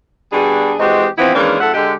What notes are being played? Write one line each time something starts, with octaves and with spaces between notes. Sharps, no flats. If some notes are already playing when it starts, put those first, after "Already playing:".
B2 G3 D4 F#4 G#4
E3 G#3 C4 F#4 G4 D#5
G2 E3 F3 B3 C4 E4
D#3 E3 G#3 A#3 C#4 D4
F2 G#2 A4 E5 F#5
D3 G#3 G4